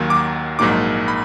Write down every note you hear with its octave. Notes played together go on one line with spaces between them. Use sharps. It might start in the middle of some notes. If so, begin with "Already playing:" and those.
Already playing: D#2 D#3 F#3 A#3
D6
A#1 G#2 F#3 A#3 D#4 D6
B5